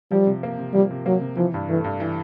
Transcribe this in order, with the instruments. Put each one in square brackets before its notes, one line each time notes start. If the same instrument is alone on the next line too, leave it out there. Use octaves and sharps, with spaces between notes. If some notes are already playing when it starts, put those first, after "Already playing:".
[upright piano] F3 [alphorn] G3
[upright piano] C3
A#3
C3
[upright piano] F3 [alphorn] G3
[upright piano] C3
[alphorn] F#3 [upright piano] A#3
[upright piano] C3
[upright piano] E3 [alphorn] F3
[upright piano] G2
[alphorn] E3 [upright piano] A3
[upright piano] G2
E3